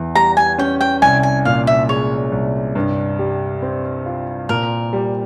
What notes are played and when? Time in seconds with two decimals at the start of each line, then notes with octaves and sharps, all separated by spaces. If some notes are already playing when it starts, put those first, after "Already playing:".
Already playing: E2 E3
0.15 G3 A#5
0.37 G#5
0.58 C#4 G5
0.81 G5
1.02 C2 G#5
1.23 G#5
1.45 A#2 F5
1.67 E5
1.89 G#3 C#5
2.32 C2
2.75 G2
3.19 G3
3.62 C4
4.06 F4
4.49 A#2 A#4
4.93 G3